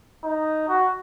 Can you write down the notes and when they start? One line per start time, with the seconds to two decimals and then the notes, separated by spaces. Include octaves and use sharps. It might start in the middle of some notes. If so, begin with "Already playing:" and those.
0.24 D#4
0.68 F#4